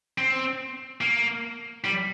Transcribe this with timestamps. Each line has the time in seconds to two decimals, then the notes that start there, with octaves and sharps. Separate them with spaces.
0.18 C4
1.01 A#3
1.84 G3